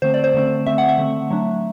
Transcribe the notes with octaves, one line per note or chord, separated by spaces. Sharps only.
D3 A3 C4 C5
D5
C5
D3 A3 C4
D3 A3 C4 E5
F#5
E5
D3 A3 C4
F#3 A3 D4